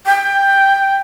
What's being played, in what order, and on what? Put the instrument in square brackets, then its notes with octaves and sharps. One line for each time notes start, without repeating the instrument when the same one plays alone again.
[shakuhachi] G5